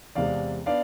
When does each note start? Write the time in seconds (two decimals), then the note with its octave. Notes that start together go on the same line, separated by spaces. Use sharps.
0.15 E2 C3 G#3 D5 F5
0.66 B3 D4 D5 F5